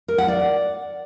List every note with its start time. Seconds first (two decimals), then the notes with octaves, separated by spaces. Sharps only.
0.08 A#4
0.18 F#5
0.28 D5